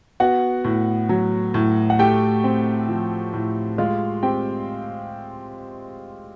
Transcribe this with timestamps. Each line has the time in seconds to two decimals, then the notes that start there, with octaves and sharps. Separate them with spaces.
0.20 B3 F#4 F#5
0.65 A2
1.09 F#3
1.54 A2
1.90 F#5
1.99 A3 G4 G5
2.44 C4
2.89 F3
3.33 A2
3.78 G#3 F4 F5
4.23 C4 G4 G5